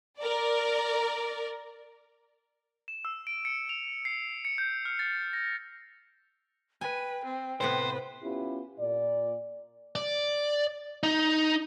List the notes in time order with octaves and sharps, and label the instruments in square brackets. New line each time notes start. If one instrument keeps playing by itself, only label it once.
[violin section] A#4 D5
[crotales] E7
E6
D7
C#7
F7
C7
C#7
G6
F6
A6
A#6
[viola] B4 [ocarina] G5 [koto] G#5
[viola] C4
[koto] A2 C3 B3 [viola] B4 [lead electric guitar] C5
[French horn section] B3 C#4 E4 F4 G4
A#2 D5
[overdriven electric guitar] D5
D#4